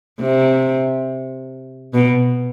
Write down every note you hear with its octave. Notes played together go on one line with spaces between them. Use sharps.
C3
B2